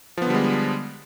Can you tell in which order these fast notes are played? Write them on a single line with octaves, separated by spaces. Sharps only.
F3 B3 D3 G3 G#3